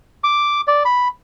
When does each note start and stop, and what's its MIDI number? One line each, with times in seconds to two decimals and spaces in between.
0.24 0.61 86
0.68 0.83 74
0.85 1.08 83